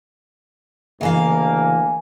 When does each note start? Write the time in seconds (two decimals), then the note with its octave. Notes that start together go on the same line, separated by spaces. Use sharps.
1.01 D2 C#3 E3 A#3 D#5 F5 G#5